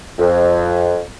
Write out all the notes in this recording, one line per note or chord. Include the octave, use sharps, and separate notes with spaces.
F2